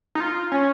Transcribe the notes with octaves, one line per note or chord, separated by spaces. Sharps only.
D#4
F4
C#4